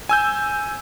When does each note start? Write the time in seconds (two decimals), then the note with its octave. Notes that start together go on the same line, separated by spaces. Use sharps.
0.09 G#5 E6 G6